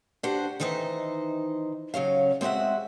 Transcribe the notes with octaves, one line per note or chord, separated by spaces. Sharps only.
D4 F#4 G4 C5 F#5
D#3 E3 D#4 C5 D#5
C#3 F#3 C#4 F5
G#3 C4 F#4 E5 F#5